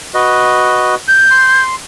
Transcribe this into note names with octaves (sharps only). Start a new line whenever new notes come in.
F#4 B4 D#5
G6
C6